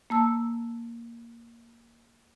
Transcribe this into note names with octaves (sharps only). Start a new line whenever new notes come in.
A#3 A5 E6